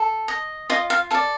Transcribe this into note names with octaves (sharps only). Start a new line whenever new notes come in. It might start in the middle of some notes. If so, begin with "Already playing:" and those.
Already playing: A4
D#5
F4 D#5
F5
A4 D5 F5